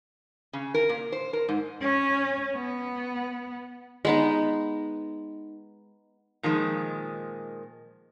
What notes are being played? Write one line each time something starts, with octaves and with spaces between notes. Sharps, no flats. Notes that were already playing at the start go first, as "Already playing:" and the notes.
C#3
A#4
A#2
C5
A#4
G#2
C#4
B3
G#3 B3 D#4
A#2 D#3 F3 G#3